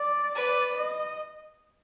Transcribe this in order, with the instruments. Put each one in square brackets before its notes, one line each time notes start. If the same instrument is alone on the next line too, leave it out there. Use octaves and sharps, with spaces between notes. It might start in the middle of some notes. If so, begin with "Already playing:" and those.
Already playing: [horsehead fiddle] D5
[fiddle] B4 [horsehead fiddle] D5
[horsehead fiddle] D#5